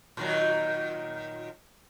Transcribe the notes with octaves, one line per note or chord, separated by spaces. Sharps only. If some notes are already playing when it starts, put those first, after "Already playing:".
A#2 D#3 F#3